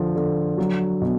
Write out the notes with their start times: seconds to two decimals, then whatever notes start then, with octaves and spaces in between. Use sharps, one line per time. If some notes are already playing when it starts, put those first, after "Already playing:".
Already playing: D3 F3
0.16 D3
0.58 F#3
1.01 B2